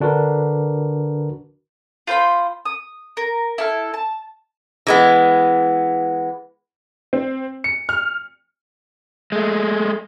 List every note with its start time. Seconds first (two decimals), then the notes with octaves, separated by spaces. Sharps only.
0.01 D3 D4 F#4 A#4 B4
2.07 F4 C5 G5 B5
2.66 D#6
3.17 A#4
3.58 E4 A4 F6
3.94 A5
4.87 E3 G#3 B3
7.13 C4
7.64 C#7
7.89 F6
9.32 G#3 A3